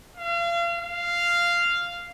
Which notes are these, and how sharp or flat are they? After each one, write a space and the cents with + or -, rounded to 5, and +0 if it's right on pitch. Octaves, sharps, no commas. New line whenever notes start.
F5 -35
F5 -10